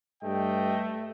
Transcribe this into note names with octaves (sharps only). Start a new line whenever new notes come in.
G2 A3 D#5 G5